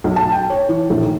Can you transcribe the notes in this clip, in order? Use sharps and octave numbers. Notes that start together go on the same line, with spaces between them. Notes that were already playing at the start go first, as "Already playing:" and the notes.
B1
A5
G5
C#5
E3
A#1
D#3